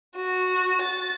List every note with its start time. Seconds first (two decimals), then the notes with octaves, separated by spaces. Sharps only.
0.16 F#4
0.81 A6